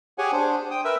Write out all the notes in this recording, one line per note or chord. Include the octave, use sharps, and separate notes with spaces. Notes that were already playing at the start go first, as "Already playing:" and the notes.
G4 G#4 C#5 F#5 G#5
D4 C5
G5 D#6
A#4 B4 E5 E6